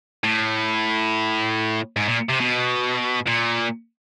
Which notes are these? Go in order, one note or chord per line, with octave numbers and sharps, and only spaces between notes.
A2
G#2
A#2
C3
B2
A#2